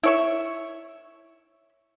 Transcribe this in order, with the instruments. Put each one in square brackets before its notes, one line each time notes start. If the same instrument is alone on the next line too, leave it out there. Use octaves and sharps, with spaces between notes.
[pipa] E4 C#5 E5